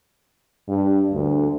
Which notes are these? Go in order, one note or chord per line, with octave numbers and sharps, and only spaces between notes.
G2
D2